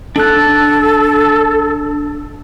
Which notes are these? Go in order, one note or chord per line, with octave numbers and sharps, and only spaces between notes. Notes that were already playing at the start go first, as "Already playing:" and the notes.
D4 A4 F#6